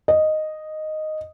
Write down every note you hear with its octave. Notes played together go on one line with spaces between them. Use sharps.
D#5